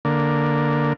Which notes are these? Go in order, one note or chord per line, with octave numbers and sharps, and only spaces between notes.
D3 A#3